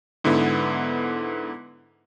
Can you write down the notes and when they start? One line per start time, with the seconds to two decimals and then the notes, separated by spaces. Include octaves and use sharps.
0.24 G#2 D3 B3 E4